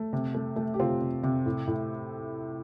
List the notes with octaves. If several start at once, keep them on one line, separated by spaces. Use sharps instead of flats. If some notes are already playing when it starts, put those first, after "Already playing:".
Already playing: A3
C3
A3
A3
G4
C3 C4 F4
C3
C3
A2
A2